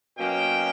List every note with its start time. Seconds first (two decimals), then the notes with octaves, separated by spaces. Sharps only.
0.17 B2 F#3 A#3 C#4 G5